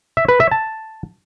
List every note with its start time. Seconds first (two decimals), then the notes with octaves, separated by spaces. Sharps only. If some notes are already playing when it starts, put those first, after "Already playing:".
0.17 E5
0.28 B4
0.40 E5
0.52 A5